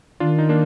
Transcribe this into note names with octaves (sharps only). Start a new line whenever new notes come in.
D#3 D4 F4
D#4
A#3 D4